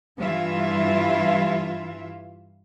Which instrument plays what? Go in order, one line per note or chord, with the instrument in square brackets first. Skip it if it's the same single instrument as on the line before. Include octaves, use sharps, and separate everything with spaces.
[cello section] G2 E3 E4 F4 E5